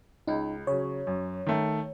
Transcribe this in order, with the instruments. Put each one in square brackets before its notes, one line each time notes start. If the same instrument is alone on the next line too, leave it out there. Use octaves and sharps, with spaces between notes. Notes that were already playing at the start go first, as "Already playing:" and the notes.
[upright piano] C#2 [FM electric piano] D#4
[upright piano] C#3 F#3 [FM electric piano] C#5
[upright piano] F#2
D#3 A3